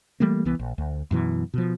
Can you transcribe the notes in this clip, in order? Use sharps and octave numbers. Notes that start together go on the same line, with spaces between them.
E3 G3 A3 A#3
C2 E3 B3
A#1
D2
F#2 B2 E3
B2 F3